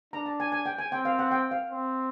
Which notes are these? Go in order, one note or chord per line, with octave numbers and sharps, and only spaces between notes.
D4 A#5
A5
G#5
G#5
G5
G#5
C4 G5
F5
F#5
G5
F5
C4